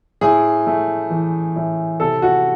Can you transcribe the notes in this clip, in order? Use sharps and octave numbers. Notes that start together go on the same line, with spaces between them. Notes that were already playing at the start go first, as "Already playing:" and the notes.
A2 G#4
A3
E3
A2
C3 A4
F#4